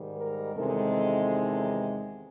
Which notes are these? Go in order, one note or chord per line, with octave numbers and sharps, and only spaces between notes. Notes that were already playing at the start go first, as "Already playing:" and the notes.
Already playing: G#2 D#3 G3
A#4
E2 C3 D#3 G#3 C4 A4